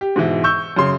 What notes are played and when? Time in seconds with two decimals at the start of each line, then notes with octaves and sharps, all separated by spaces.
0.01 G4
0.16 G#2 B2 E3
0.44 C#6 E6 G6
0.76 F#2 C#3 C6